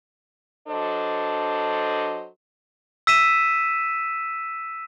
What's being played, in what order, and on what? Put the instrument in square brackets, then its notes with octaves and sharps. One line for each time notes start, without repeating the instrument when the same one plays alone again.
[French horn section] F#3 D4 A4 C5 D#5
[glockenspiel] E6 B6 D#7 E7